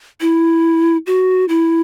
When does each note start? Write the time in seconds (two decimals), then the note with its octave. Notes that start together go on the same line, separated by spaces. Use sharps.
0.21 E4
1.07 F#4
1.49 E4